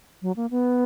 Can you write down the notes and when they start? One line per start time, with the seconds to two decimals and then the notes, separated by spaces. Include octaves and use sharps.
0.22 F#3
0.36 A#3
0.51 B3